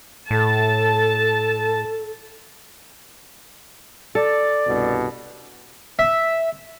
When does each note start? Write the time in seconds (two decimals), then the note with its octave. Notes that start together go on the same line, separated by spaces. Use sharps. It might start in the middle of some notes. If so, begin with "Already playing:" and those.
0.31 A2 A4 A5
4.15 A4 D5
4.68 C2 G2 B2
5.99 E5